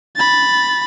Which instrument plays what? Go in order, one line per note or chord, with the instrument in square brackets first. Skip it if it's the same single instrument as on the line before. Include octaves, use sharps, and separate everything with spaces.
[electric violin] B5 A6